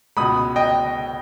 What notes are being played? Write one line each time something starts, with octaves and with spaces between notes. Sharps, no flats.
C#2 B2 G#3 B5 D#6
D#5 G5